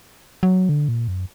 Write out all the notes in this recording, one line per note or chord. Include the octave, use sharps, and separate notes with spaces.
F#3
D3
A#2
F#2